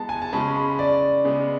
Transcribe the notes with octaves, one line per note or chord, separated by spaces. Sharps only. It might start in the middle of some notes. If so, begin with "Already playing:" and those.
Already playing: G#3 B3 A5
G#5
A5
C#3 G#3 C#4 B5
B5
D5
C#3 G#3 B3